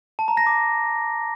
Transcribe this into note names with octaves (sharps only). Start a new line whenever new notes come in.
A5
A#5
A#6
D6